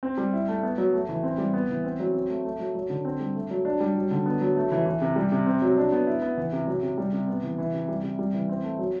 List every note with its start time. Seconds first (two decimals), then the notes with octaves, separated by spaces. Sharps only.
0.03 C4
0.18 G3
0.33 E4
0.48 A3
0.63 B3
0.78 F#3
0.93 A3
1.09 E3
1.23 C4
1.38 G3
1.54 B3
1.69 E3
1.84 C4
2.00 F#3
2.14 C4
2.29 A3
2.45 A3
2.59 F#3
2.75 F#3
2.90 D3
3.05 C4
3.20 G3
3.35 A3
3.51 F#3
3.65 D4
3.80 G3
3.95 F#3
4.11 D3
4.26 B3
4.41 F#3
4.56 A3
4.72 E3
4.86 E3
5.01 C3
5.16 G3
5.32 C3
5.47 C4
5.62 F#3
5.77 D4
5.92 B3
6.07 E4
6.22 B3
6.38 E3
6.53 C3
6.68 F#3
6.83 C3
6.98 G3
7.13 C3
7.28 B3
7.43 E3
7.58 E3
7.73 C3
7.88 G3
8.04 C3
8.19 G3
8.34 E3
8.49 C4
8.64 A3
8.79 F#3